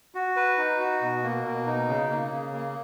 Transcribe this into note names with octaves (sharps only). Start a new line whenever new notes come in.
F#4
B4
D#4
F#4
B2
A#3
B2
D#4
C#3
A#3
C#3
A#3